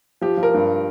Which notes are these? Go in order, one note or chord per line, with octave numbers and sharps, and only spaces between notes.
F3 G4
F3
A#4
G2